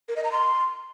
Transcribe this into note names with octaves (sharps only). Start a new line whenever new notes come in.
A#4
D#5
A#5
C6